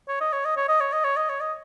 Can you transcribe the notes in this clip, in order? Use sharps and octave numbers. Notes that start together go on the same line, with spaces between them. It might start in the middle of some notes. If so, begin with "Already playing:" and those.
C#5
D#5
C#5
D#5
C#5
D#5
C#5
D#5
C#5
D#5
C#5
D#5